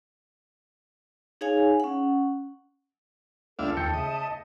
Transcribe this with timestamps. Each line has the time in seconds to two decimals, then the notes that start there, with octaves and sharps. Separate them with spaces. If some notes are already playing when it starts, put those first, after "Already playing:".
1.41 D#4 G#4 C#5 F5 G#5
1.80 C#4 F#5
3.59 C#2 D4 A4 E5 F5
3.77 D#2 G5 G6 C#7
3.94 C#3 D#5 E5 A5
4.28 D#5